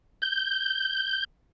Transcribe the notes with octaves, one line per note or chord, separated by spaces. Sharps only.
G6